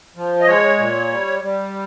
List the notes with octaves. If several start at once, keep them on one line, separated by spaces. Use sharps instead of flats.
F3
D#5
G#3 C#5
A#2
G3
G3